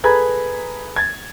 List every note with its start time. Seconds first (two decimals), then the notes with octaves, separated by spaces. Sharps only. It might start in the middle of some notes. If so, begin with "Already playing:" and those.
0.04 G#4 A4 B4 A#5 B5 G#6
0.96 G#6 A6